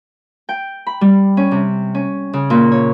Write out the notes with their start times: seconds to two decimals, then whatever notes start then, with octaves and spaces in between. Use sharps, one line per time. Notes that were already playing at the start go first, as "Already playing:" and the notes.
0.49 G5
0.87 B5
1.01 G3
1.37 C#4
1.51 C3
1.95 C#4
2.33 C#3
2.50 A#2
2.72 C#5